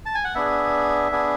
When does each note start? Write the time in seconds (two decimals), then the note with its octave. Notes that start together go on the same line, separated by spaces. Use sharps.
0.06 A5
0.15 G#5
0.25 F#5
0.35 B3 D4 G#4 E5
1.12 B3 D4 G#4